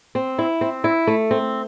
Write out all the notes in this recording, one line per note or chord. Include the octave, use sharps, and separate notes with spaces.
C4
E4
C4
E4
A3
C4